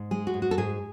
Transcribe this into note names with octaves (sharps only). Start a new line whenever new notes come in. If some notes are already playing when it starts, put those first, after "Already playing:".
Already playing: G#2
G#3 G#4
F#4
G#2
F#4
A4
G#2 G#4